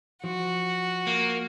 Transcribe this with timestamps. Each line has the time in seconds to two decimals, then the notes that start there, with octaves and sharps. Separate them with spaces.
0.24 F3 F#4
1.07 A#3